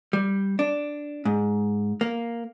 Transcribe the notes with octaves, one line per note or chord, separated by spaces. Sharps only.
G3
D4
G#2
A#3